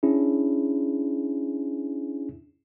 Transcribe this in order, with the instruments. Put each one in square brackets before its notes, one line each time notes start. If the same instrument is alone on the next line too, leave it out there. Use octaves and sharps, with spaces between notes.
[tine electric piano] C#4 D4 E4 G#4